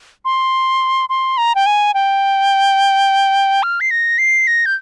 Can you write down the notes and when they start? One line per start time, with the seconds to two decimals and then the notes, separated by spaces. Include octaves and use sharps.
0.25 C6
1.10 C6
1.38 A#5
1.55 G5
1.66 G#5
1.94 G5
3.63 F6
3.81 C7
3.91 A#6
4.18 C7
4.47 A#6
4.66 G6